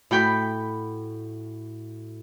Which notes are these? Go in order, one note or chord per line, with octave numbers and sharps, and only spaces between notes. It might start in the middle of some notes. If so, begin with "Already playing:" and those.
A2 F#4 G5 B5 G6